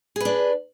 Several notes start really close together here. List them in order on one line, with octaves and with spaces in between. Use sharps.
G#4 B4 D4